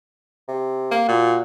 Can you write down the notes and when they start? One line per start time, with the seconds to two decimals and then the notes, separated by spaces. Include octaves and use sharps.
0.48 C3
0.91 A#3
1.08 A#2 F#4